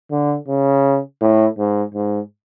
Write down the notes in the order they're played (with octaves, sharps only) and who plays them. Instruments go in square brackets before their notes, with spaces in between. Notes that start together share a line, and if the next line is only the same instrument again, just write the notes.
[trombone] D3
C#3
A2
G#2
G#2